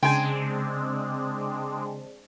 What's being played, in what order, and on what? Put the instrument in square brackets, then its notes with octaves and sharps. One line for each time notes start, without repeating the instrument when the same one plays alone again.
[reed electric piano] C#3 C6 [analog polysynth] G#3 C4 D4 [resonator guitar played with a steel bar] G5 G#5